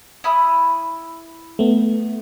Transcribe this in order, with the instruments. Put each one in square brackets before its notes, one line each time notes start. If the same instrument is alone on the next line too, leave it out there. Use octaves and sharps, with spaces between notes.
[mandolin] E4 B5 D#6
[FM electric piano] A3 B3